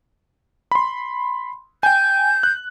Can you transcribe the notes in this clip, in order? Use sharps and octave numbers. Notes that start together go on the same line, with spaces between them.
B5 C6
G5 G#5 G6
F#6